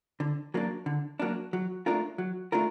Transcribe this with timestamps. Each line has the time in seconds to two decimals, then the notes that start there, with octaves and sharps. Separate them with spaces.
0.20 D3
0.54 F#3 A#3 D4
0.86 D3
1.20 F#3 A#3 D4
1.53 F#3
1.86 A3 D4 F4 A#4
2.18 F#3
2.52 A3 D4 F4 A#4